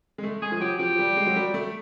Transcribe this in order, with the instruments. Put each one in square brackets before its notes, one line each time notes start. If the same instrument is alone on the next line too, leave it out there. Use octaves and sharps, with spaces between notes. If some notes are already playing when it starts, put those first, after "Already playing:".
[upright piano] G#3
A3
[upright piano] G#3 [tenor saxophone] G#4
[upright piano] F3
[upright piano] F#3 [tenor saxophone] G4
[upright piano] F3 [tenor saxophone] G4
[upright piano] G3
G#3
F#3
G3
A3